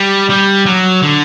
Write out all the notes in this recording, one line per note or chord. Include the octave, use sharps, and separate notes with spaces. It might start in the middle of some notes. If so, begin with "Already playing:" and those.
Already playing: G3
G3
F#3
D3